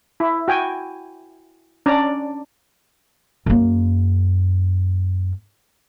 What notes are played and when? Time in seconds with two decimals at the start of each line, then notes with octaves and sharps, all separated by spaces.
0.20 E4
0.48 F#4 G5 G#5
1.86 C#4 D4 D5 A#5
3.46 F#2 A#3